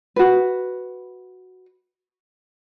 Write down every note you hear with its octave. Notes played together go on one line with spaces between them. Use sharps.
F#4 B4